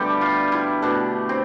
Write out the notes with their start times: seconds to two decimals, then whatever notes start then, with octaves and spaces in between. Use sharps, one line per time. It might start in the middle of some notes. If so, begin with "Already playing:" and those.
Already playing: B2 D3 G3 A3 G4 A4
0.21 F4
0.52 E4
0.82 B2 A3 D4
1.29 C4